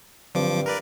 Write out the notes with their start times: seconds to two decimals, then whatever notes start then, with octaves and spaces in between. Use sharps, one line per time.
0.35 G2 D3 F3 F#3 C4 D6
0.66 A#4 B4 D5